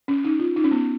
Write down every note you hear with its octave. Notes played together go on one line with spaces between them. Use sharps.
C#4
D#4
F4
D#4
C#4
B3